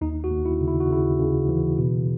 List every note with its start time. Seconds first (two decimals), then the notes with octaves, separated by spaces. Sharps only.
0.01 D#2 D#4
0.24 F#4
0.31 D#2
0.45 E4
0.61 C#3
0.68 E4
0.80 F#4
0.89 C#3 E4
1.19 C#3
1.49 E3
1.78 B2